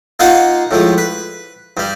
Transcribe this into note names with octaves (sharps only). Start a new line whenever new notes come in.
A#3 D#4 F4 F5 F#5
A2 F3 G#3
B4
G2 G3